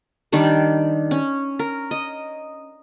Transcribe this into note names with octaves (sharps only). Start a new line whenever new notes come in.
D#3 G3 D4 D5
C#4
A#4
D#5